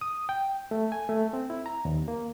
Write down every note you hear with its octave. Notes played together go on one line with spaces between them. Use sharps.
D#6
G5
A3
G#5
A3
C4
E4
A#5
D#2
A#3